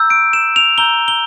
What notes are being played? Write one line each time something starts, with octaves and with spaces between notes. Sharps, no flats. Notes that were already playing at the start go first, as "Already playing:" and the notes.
Already playing: A#5 E6 G6
D7
E7
F7
A#5 E6 G6 G7
G7